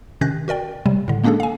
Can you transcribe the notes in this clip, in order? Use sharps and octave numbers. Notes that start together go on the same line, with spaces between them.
C3 D#3 C#4 F#6 G6 A#6
F#4 A#4 D5 G5
C3 F#3 G3
A2 D3
G#3 A#3 C#4 D4 G#4 A4
F5 G#5